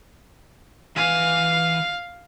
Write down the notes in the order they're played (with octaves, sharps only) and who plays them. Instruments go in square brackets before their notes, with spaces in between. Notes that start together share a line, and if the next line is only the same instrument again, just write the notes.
[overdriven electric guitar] E3 G#5 [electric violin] F5